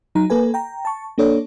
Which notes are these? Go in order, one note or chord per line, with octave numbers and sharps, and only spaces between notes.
F#3 D#4 A#5
A#3 A4 B4 G#5
G5 A#5
A5 C#6
A#3 D4 A4 C#5 D5